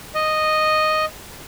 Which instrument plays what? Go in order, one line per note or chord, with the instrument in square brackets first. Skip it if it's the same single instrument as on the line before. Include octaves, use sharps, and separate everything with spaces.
[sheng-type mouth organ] D#5